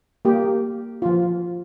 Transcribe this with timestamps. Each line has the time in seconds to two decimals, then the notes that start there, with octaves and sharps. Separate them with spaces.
0.25 A#3 G4
1.02 F3 F4